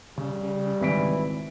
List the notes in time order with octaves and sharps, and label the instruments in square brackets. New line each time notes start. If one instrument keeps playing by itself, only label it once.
[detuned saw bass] C#3 [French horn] G3
[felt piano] G#1 B6 D7 [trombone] E3